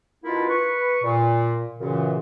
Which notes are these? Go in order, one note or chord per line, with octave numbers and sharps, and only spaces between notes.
B2 A#3 D4 E4 F4
B4 C#6
A#2
F#2 A#2 C#3 E3